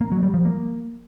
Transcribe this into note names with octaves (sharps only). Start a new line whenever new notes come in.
A#3
F#3
G3
F3
A#3